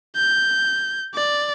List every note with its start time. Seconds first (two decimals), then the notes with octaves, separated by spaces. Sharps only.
0.16 G6
1.15 D5